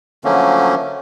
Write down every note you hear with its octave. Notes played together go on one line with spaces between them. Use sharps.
D3 F3 F#3 A3 A#3 C#4